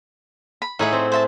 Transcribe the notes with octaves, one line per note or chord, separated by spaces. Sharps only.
B5
A2 D#4 G#4 E5 F#5
C4
C5 E5 A5